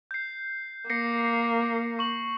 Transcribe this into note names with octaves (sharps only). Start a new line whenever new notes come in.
G6 C7
A#3 A#6 C7 C#7
C#6 F#7